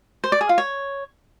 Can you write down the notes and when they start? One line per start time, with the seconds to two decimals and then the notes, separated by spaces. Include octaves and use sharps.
0.24 C5
0.32 D5
0.41 G#4
0.49 F4
0.58 C#5